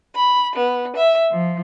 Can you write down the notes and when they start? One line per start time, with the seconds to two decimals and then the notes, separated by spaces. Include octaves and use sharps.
0.13 B5
0.54 B3
0.94 E5
1.31 F3